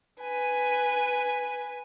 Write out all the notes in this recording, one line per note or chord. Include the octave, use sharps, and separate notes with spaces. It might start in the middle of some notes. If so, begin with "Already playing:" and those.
B4 G#5